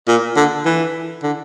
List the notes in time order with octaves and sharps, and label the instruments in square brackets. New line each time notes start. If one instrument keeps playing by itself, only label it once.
[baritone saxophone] A#2
D3
E3
D3